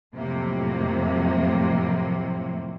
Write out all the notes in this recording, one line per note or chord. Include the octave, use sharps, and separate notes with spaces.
F2 A2 C3 F#3 A#3